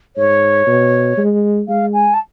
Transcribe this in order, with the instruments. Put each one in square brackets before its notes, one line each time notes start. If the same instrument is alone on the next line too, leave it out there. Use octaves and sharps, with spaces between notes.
[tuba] G#2 [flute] C#5
[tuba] B2
G#3
[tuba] G#3 [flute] F5
[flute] G#5
A5